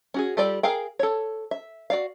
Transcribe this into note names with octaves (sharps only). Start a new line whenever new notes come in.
C#4 F#4 G#4
G3 F4 G4 A4 D5
G#4 A#4 F5 G5
A4 C#5
E5
F#4 D5 F5